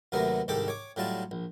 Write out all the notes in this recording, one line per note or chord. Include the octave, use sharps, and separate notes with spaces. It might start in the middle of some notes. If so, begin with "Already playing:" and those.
D#2 C3 F#3 A3 B3 A#4
C2 G#2 D#3 G4 A4 D6
C#5 D6
A2 F#3 G3 F4 A5
A#1